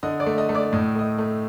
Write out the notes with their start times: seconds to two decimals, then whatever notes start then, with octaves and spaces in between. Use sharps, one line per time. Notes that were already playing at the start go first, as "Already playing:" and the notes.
0.03 D3 D#5 D#6
0.20 D5 D6
0.26 A3
0.38 D#5 D#6
0.49 A3
0.55 D5 D6
0.73 A2 D#6
0.95 A3 D#5 D#6
1.18 A3